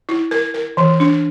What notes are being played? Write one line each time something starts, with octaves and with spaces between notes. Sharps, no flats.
E4
A#4
A#4
E3
D4